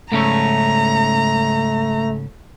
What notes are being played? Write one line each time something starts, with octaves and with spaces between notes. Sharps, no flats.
G#2 C#3 A3 C#4 A#5